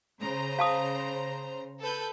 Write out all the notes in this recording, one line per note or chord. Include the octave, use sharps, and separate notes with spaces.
C#3 C5 A#5
F5 A5 D#6
A4 B4 G6